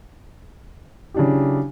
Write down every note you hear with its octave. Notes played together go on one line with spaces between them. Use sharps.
C#3 F#3 D4 E4 G4